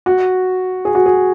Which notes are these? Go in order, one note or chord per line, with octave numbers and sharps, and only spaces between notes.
F#4
G#4
F#4
G#4